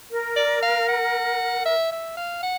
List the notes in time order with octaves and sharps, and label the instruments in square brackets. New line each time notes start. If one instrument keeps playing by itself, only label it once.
[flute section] A#4
[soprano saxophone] D5
F5
F#5
E5
E5
F5
F#5